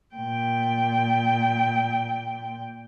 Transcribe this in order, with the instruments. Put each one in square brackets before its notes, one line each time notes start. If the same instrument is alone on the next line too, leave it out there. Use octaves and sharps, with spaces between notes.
[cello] A#2 G5